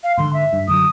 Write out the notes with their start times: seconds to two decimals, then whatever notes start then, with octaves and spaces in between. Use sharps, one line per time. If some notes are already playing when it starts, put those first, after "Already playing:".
0.04 F5
0.17 G#2 D3 C6
0.33 E5
0.53 G2
0.68 F#2 D3 F#3 D#6